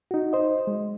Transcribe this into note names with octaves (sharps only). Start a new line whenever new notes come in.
D#4 F#4
C5 D#5
G#3